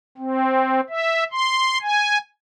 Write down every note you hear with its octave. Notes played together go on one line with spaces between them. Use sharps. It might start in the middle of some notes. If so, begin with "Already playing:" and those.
C4
E5
C6
G#5